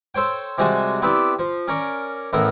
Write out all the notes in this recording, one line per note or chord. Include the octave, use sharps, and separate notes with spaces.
A4 C5 C#5 G5
C3 G3 G#3 F#4 G#5 A5
B3 C4 E4 G4 D5
F3
C#4 A#4 C#5 D5
A1 A2 B3 A4 A#4